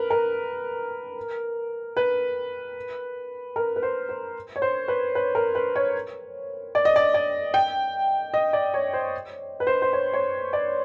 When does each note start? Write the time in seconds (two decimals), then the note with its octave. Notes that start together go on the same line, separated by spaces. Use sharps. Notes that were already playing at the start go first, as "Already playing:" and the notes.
Already playing: A#4 B4
0.10 A#4
1.97 B4
3.56 A#4
3.76 B4
3.83 C5
4.09 C5
4.56 C#5
4.62 C5
4.88 B4
5.15 B4
5.35 A#4
5.55 B4
5.76 C#5
6.75 D5
6.85 D#5
6.96 D5
7.14 D5
7.54 G5
8.34 D#5
8.53 D5
8.74 C#5
8.93 C5
9.60 B4
9.67 C5
9.82 C5
9.93 C#5
10.14 C#5
10.53 D5